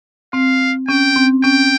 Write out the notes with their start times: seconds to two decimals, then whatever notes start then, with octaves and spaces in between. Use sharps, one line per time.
0.33 C4 F5
0.88 C#4 G5
1.16 C4
1.43 C#4 G5